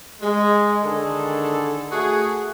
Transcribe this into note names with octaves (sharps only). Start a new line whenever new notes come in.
G#3
D3 D#3 G#4 A4
A3 F#4 G#4